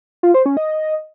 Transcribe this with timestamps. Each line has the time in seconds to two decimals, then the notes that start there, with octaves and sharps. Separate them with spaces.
0.23 F4
0.34 C5
0.46 C#4
0.57 D#5